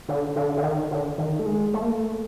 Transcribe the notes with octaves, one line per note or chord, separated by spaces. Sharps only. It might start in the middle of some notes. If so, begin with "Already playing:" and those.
D3
D3
D3
D#3
D3
D#3
A3
G#3
A3
A#3
A3